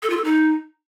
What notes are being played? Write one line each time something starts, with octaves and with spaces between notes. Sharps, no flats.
A4
F4
A4
D#4